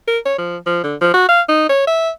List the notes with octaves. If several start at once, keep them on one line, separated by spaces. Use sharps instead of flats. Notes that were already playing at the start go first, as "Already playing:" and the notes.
A#4
C#5
F3
F3
D3
F3
F#4
F5
D#4
C#5
E5